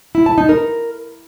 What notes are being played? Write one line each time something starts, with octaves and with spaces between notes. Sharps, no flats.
E4
A5
D#4
A#4